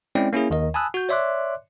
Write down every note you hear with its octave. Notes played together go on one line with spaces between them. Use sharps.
G#3 C4 C#4 E4 D5 G5
A#3 C#4 E4 G#4
D#2 D#3 A#4 D#5
G#5 A5 B5 D#6 E6 F#6
F#4 G6
C#5 D5 E5 C6 D6 F#6